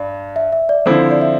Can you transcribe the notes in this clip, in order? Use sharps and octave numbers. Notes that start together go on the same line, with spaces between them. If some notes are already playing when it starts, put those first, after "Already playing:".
Already playing: G2 D5
E5
E5
D5
D3 F3 C4 E4 C5
D5
E5